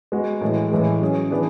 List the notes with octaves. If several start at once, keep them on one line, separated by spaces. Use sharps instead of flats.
G#3 B3 F#4
A2 E3 G#3
A2 E3 G#3
F#3 C#4 G#4
E3 B3 D4 G#4